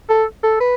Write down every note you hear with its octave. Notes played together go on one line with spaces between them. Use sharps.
A4
A4
B4